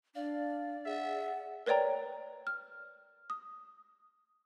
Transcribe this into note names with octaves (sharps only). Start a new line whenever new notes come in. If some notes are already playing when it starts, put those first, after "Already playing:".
D4 D5 F5
G#4 E5 F#5
A#4 B4 C#5 D5 G5 A#5
F6
D#6